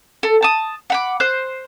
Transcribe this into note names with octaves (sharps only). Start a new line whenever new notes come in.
A4
A5 D#6
F#5 B5 D6
C5 F#6